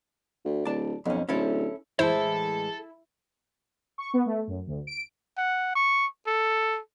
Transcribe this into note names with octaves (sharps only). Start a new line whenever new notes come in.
D2
D1 D5 A5
B1 F2 C#4
D1 C#4 E4 A4
A2 E3 G#3 E4 A4 C5 A5
C#6
B3
A3
F#2
D2
D7
F#5
C#6
A4